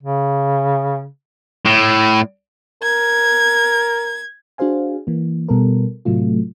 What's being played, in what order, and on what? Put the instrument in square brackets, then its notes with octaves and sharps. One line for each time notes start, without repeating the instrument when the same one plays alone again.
[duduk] C#3
[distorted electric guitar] A2
[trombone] A#4 [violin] G#6
[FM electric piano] D4 F#4 G#4 C5 F5 G#5
E3 A#3
B2 G3 B3 A4 A#4
A2 C3 F#3 A3 F4